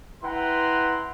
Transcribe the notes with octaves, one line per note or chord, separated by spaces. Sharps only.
E4 B4 F#5 G5 A#5 C6